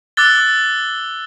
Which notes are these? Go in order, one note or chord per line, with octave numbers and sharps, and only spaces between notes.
D6 E6 F#6 A6 G7